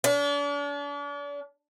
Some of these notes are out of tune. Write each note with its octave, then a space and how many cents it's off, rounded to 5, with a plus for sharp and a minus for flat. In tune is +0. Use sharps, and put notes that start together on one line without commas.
D4 -40